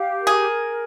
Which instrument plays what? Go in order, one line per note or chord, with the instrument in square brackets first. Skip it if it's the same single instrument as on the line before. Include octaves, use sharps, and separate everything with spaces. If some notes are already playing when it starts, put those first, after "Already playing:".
Already playing: [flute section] G4 F5
A#4
[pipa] G#4